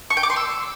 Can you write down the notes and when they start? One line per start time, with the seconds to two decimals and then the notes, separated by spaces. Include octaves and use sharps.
0.10 C#6
0.17 G5
0.23 D6
0.30 C6
0.36 E6